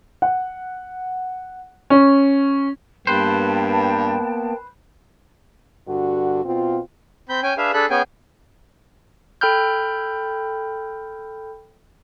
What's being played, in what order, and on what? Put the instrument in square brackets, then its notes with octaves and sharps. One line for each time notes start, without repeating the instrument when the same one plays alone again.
[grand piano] F#5
C#4
[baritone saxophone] G2 [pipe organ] A#3 B3 [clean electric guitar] B4 C5 [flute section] G5 A5
[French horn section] G2 D3 F#4
B2 C4 F4
[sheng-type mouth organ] C4 B5 G6
C#4 G5 G#5
D4 G#4 B4 E5 F5
D4 G#4 A4 B5 F#6
B3 C#4 G#4 G5 G#5
[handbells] A4 G5 B5 F6 G6